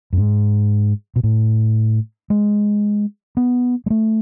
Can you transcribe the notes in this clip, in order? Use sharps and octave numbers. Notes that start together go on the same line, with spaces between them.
F#2
G#2
B2
A2
G#3
B3
G#3
A3